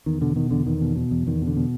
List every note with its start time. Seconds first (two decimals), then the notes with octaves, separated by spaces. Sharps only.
0.06 E2 D#3
0.21 B2 D3
0.36 B2 D#3
0.51 E2 D3
0.66 E2 D#3
0.81 B2
0.96 B2
1.11 E2
1.27 E2 D#3
1.42 B2
1.47 D3
1.56 B2